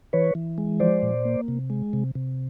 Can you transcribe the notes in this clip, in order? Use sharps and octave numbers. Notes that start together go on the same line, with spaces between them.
E3 B4 C#5
E3
G#3
F3 C5 D5
A#2
A#3
C3
G#3
C3
C3